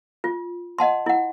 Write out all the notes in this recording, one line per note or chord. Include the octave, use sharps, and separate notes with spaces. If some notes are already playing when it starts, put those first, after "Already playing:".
F4
D#5 F#5 A5 C6
E4 F#5